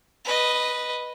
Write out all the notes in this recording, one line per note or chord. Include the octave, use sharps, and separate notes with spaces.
B4 D#5